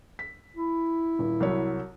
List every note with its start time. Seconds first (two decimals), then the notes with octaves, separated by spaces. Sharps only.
0.19 B6
0.56 E4
1.19 D#1
1.40 C2 F#3 C#5